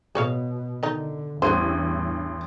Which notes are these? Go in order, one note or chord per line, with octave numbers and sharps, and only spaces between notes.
B2 G#4 C#5 F5
D3 D#3 D#4
A1 E2 G2 B3 C5 C6 D#7